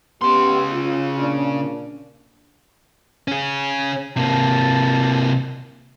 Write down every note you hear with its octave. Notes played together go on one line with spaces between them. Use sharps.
C#3 B3 G4 C6
F4
A#2 D4
C#4 G#4
C3 A#3 A5